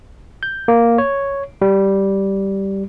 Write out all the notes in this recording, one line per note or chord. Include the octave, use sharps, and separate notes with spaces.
G6
A#3
C#5
G3